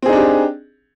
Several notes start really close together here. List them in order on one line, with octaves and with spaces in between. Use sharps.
C4 G#4 D#4 D4 G4